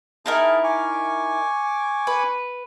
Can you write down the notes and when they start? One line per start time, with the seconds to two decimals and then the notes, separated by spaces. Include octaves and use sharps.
0.26 D#4 E4 G#4 A#4 A5
0.64 G#5 C#6 D6
2.07 B4